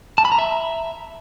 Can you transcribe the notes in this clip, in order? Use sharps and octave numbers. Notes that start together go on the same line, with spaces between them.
A5
B5
A#5
E5